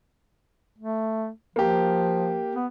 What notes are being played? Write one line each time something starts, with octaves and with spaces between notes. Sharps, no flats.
A3
F3 A#3 G4
B3